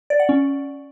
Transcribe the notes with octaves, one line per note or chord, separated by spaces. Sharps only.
D5
F#5
C#4